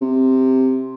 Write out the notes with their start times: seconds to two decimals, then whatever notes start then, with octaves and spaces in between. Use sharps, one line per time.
0.02 C3